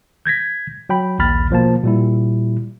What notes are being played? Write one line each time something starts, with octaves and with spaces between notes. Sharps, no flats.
G6 G#6 A#6 B6
F#3 G5 B5
A#1 D#2 B5 F6 A6
B2 F3 A#3 A5
A#2 G3 E4